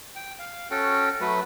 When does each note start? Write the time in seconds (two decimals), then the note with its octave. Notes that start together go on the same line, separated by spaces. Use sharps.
0.16 G5
0.39 F5
0.71 C#4 F#4 A4 G5
1.21 F#3 A3 B4